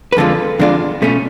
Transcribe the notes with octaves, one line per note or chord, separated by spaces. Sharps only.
B4
F2 D3 G#3 D4 F4 A4
F2 D3 G#3 D4 F4
B2 A3 C#4